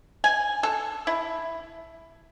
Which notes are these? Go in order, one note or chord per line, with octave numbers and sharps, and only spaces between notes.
G#5
A4
E4